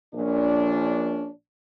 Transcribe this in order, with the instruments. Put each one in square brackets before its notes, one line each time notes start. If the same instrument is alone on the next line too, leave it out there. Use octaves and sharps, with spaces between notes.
[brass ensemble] A#1 A#2 C#4 D4